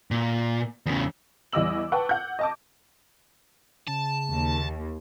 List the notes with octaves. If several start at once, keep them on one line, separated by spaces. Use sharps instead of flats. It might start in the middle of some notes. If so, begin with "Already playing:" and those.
A#2
E2 C#3
E2 G3 D#5 D6 E6 F#7
B4 F#5 G5 A5 C#6
F#5 G6
D#5 A5 D6
C#3 A5
D#2